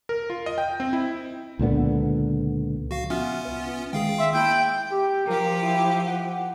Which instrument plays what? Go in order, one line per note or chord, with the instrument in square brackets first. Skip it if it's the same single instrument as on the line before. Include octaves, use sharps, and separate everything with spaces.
[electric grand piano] A#4
F4
D#5
G5
C4
E4
[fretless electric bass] C#2 A#2 D3 B3
[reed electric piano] F3 [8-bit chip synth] F#4 F5
[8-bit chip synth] B3 C#4 F4 [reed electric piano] E5 F#5 F6
[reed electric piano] C2 B4 E5
[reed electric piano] D#3 G#3 [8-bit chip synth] G#4 F5 G5
[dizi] E5 [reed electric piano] C6
[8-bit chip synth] A#3 E4 B5 [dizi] G5
[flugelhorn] G4
[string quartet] F3 G4 [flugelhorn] A#4
[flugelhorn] E4
F#5